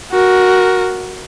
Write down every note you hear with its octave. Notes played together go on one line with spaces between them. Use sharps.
F#4 A#4